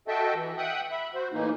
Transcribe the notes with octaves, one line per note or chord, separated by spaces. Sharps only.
F#4 A4 D#5 E5 G5 A5
E3
E5 F#5 G5 D#6 F#6
E5 B5
F#4 C5
A2 E3 A#3 D#4